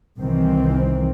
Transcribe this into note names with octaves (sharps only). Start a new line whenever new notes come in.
C2 D#3 E3 C4